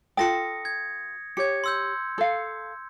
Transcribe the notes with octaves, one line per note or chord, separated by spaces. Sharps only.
F4 A4 G5 D#6 A#6 C#7
G#6
G4 C#5 G#6 C#7
C6 E6 G6
A4 F5